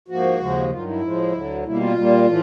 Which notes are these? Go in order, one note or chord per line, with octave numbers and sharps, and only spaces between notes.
G#2 F3 A#3 F#4
D#2 C#3 F3 G#3
G2 D#3 F#3 F4
E4
A2 F3 G#3
D2 D3 F#3
B2 G3 A#3 E4
F4
A#2 G3 A#3
A2 E3 A3